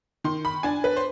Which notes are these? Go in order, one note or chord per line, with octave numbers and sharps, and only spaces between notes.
D#3 C6
B5
D4 G#5
B4
C5